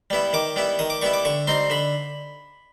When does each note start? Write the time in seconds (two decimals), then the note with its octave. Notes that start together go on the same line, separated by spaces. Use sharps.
0.10 G3 B3 E4
0.33 D#3 D6
0.56 G3 B3 E4
0.79 D#3 D#6
0.90 D6
1.02 G3 B3 E4 C#6
1.14 D6
1.25 D3 C#6
1.47 G3 C4 D#4 C6
1.70 D3 B5